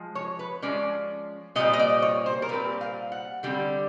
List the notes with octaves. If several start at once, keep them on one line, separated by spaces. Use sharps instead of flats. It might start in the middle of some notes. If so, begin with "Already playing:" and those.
Already playing: F3 G#3
C#5
B4
F3 G#3 C#4 D5
A#2 G3 C4 D#5
D#5
D5
C#5
C5
A#4
A#2 G3 C4 B4
F5
F#5
D3 G3 C4